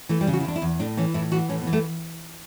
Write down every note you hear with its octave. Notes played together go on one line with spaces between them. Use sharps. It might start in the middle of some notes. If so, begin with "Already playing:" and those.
E3 A3
G3
C#3
F#4
E4
E2 D4
E4
E2
A2 D4
E3 C#4
A2 E4
E3 F#4
A2 C#4
B3
E3
A3